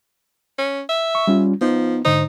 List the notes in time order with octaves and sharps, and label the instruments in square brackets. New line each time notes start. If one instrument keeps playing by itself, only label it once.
[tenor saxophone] C#4
E5
[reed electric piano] C#6
G3 C#4 F4
[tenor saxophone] F3 [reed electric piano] B3 D#4
[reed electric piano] G#2 D3 C5 [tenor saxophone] D#4